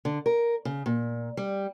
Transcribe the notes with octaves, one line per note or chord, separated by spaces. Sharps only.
D3
A#4
C#3
A#2
G3